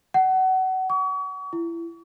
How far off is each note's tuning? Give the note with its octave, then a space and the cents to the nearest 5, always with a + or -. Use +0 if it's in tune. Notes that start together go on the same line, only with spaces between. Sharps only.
F#5 +25
C#6 +40
E4 +30